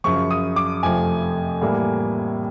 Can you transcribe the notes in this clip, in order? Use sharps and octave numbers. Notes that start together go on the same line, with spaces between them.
F#2 C#3 F3 C#6
D#6
D6
F2 C3 F3 A3 G#5
A2 E3 G3 A#3